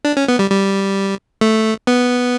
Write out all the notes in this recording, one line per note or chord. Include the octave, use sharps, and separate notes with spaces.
D4
C#4
B3
G3
G3
A3
B3